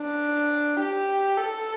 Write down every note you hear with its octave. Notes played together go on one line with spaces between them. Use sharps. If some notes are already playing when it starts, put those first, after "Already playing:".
Already playing: D4
G4
A4